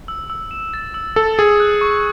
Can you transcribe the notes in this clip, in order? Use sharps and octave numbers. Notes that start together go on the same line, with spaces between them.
E6
E6
E7
A6
E6
A4 E6
G#4 C#7
F#6
C#6